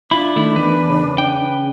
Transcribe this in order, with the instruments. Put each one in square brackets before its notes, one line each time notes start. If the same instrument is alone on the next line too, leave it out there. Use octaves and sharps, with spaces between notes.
[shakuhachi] D4 [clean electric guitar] E4 F4 [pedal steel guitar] B5
[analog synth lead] D#3 [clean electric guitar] A3 E4
[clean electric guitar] E2 [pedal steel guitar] B4
[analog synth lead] C#3
[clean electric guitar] G5